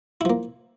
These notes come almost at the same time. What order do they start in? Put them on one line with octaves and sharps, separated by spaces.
E4 F3 A#3